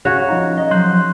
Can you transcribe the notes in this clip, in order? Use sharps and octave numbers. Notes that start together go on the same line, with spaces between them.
C#3 F#4 C#5
F3 D#4 A#5
D#5
F3 F#3 C6 F#6 G6